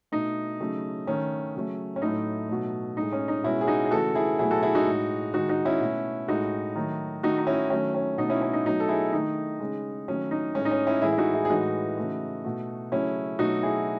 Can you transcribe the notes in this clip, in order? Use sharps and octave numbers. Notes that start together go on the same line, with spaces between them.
B2 A3 D#4
C#3 F#3 A3
D#3 A3 C#4
C#3 F#3 A3
C#4
A2 F#3 A3 D#4
B2 F#3 A3
A2 G#3 D#4
C#4
D#4
B2 G#3 C#4 E4
G#4
D#4 F#4
G#4
C#3 E3 A3 F#4 A4
E4 G#4
B2 F#3 A3 E4 G#4
F#4 A4
E4 G#4
D#4 F#4
A2 G#3
D#3 G#3 D#4 F#4
D#4 F#4
C#4 E4
B2 A3
A2 G#3 D#4 F#4
D#3 F#3 A3
D#3 A3 D#4 F#4
D#4
C#4 E4
D#3 F#3 A3 C#4
C#4
B2 A3 D#4
C#4 E4
C#4
D#4
B2 F#3 A3 D#4
A4
E4 G#4
D#3 A3 D#4
C#3 G#3
D#3 F#3 A3 C#4
D#4
A2 G#3 C#4
D#4
C#4
C#4 E4
A2 E3 G#3 E4 G#4
E4
D#4 F#4
E4 G#4
G#4
A2 E3 G#3 D#4 F#4
C#3 E3 A3
B2 A3
C#3 F#3 A3 C#4 E4
B2 F#3 A3 D#4 F#4
E4 G#4